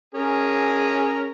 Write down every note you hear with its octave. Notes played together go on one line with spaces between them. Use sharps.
C#4 G#4 A#4